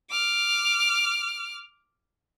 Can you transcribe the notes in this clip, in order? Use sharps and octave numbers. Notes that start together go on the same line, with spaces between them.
D6 F6